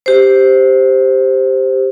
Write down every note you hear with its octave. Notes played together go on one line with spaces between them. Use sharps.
G4 C5